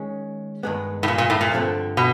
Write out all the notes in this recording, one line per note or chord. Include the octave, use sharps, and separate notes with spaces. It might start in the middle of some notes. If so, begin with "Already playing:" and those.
Already playing: D#3 G#3 C#4
G2 D#3 G#3 B3
A2
A#2
A#2
A2
A#2
G2 D3 F3 A3 C4
B2